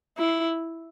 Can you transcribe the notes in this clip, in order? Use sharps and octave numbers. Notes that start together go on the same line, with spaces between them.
E4